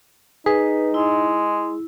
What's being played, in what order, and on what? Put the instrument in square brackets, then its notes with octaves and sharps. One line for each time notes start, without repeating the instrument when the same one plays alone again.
[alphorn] D#4 [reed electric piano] G#4 [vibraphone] B4
[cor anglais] G#3 [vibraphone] E4